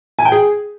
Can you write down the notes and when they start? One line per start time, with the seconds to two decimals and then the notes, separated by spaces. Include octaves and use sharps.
0.19 G#5
0.25 G5
0.32 G#4